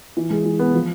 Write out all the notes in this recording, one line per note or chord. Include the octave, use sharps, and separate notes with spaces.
E3
G#3
E3
B3
F3